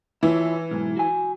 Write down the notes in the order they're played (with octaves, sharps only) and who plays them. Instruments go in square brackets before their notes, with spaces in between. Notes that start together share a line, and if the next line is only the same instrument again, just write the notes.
[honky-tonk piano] E3 [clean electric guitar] E4 F4 C#5
[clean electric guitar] B1 G#2
F#4 G#5